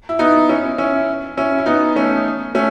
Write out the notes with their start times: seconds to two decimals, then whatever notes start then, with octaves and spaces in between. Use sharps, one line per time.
0.09 E4
0.19 B3 D#4
0.49 C#4 E4
0.78 C#4 E4
1.37 C#4 E4
1.58 E4
1.66 B3 D#4
1.96 A3 C#4
2.55 A3 C#4